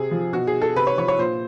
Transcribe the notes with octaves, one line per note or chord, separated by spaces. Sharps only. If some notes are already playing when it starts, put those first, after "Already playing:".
Already playing: C3 G#4
F3
B2 F#4
G#4
A4
C3 B4
C#5
F3 C#5
C#5
A#2 C5